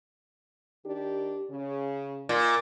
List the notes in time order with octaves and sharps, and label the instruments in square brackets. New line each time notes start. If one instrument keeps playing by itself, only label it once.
[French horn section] D#3 D4 G4
C#3
[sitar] A#2